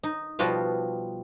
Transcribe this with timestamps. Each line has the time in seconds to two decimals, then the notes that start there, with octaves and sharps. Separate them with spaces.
0.03 D#4
0.39 B2 F3 G3 F4 F#4 B4